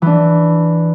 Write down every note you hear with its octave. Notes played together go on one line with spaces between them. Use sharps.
E3 D4